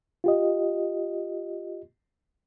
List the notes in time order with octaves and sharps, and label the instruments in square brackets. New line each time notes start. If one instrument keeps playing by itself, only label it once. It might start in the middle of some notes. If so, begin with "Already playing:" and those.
[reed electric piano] F4 G4 D#5